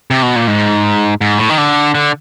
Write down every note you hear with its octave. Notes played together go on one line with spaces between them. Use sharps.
C3
B2
A#2
G#2
G#2
A2
D#3
D3
D3